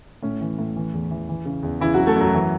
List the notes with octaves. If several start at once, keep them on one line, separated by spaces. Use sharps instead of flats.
A2 C#4
E3
A2
E3
E2
E3
E3
C#3
E2
C#3 E3 E4
C#3 F#3 F#4
A3 A4
F#2 F#3 F#4
E3